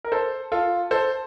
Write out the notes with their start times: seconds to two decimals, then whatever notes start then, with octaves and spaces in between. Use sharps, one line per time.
0.04 A#4
0.12 A4 C5
0.52 F4 A4
0.91 A4 C5